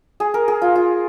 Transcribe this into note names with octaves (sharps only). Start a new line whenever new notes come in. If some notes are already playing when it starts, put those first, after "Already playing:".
G#4
A#4
G#4
F4
F4